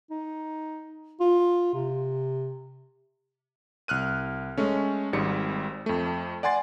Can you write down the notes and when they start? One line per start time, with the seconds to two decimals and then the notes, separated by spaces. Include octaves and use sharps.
0.10 D#4
1.20 F4
1.74 C3
3.88 C2 F6 F#6 D#7
4.58 G#3 A3 C#4
5.13 G#1 G#2 G3 C#7
5.86 F2 A3
6.43 D5 F#5 G#5 C6 A6